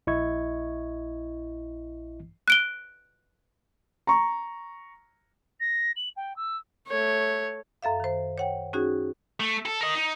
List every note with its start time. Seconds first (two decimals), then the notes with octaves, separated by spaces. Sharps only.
0.07 A#1 E4 D#5 C#6 G#6
2.48 F#6 D7 G7
4.07 A#5 C#6
5.60 A#6
5.96 F#7
6.16 G5
6.36 E6
6.88 A3 C#5
7.82 F#2 A4 E5 F5
8.00 D#3 C5
8.38 C#5 F#5 G5
8.73 C#4 D#4 F#4 G#4
9.40 A3
9.66 A4
9.81 A#4 D#5
9.95 D#4